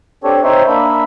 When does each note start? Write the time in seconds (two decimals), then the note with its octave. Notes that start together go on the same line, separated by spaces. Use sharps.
0.24 C4 D4 G4 A4 C#5
0.44 C4 D#4 C5 C#5 E5 C6
0.67 A#3 D4 E5 B5